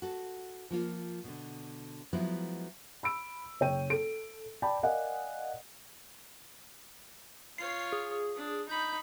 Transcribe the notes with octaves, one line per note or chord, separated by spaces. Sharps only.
F#4 A4
F3 A#3 F4
B2 D3
F3 F#3 G#3 B3 E4
B5 E6 D7
F#1 C#5 G5 D#7
A4 D7
D5 G5 A5 B5
A#4 D5 D#5 F5 F#5 G#5
F4 C#5 C7
G#4
D4
D#4 B5 G6